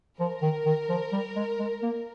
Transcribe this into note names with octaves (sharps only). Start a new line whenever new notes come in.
F3 A#4
D#3
D#3
F3
G3
G#3
G#3
A#3